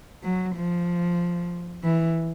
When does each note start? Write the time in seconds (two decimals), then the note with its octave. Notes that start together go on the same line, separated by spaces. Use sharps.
0.23 F#3
0.56 F3
1.84 E3